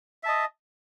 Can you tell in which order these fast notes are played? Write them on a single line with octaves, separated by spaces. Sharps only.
E5 A5 D#5